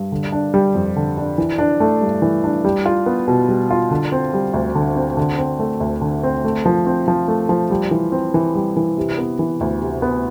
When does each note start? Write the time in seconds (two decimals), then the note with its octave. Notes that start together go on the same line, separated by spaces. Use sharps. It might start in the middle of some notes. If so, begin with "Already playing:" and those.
Already playing: G2
0.12 D3
0.32 D4
0.54 G3
0.75 F2
0.96 D3
1.17 D4
1.38 E3
1.58 D4
1.80 A3
2.01 G2
2.22 E3
2.44 D4
2.64 G3
2.86 F4
3.06 B3
3.28 B2
3.49 G3
3.70 F4
3.91 D3
4.12 C4
4.34 G3
4.54 D2
4.75 D3
4.96 C4
5.17 D3
5.38 C4
5.59 A3
5.80 D2
6.01 D3
6.24 C4
6.45 A3
6.66 F3
6.86 C4
7.08 F3
7.28 A3
7.49 F3
7.70 G3
7.91 E3
8.12 C4
8.34 E3
8.55 G3
8.77 E3
8.97 C3
9.18 B3
9.39 E3
9.61 D2
9.81 C3
10.02 B3